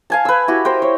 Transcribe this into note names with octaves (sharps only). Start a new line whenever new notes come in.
F5 G#5 A5
B4 E6
E4 F#4 G4
A#4 C5 G5
C#5